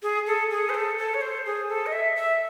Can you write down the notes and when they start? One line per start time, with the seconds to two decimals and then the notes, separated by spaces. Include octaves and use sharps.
0.03 G#4
0.27 A4
0.51 G#4
0.69 C5
0.75 A4
0.98 A4
1.14 C#5
1.21 C5
1.46 G#4
1.69 A4
1.86 D#5
1.92 E5
2.16 E5